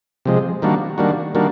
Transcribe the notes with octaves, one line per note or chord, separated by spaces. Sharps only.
C3 F3 G#3
D#3 G3 A#3 D4 F#4
D#3 G3 A#3 D4 F#4
D#3 G3 A#3 D4 F#4